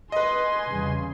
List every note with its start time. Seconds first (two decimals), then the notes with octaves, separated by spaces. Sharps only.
0.12 B4 D#5 G#5 C6
0.69 E2 C#3 G3